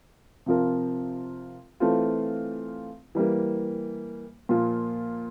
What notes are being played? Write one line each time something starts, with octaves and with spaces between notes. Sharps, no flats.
C3 F3 C4 F4 A#4
E3 A3 C4 F4
E3 G3 A#3
A#2 F3 A#3 F4